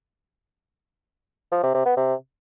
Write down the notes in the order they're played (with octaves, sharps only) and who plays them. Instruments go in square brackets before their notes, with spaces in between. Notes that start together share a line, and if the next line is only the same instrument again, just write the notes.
[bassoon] F3
C3
C3
B3
C3